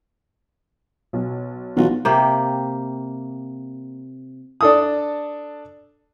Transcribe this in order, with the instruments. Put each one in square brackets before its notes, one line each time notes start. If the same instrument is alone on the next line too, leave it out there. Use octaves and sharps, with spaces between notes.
[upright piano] B1
[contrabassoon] B1 [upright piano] E3 F4 F#4
[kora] C3 A#3 G4
[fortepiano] D4 A4 D#6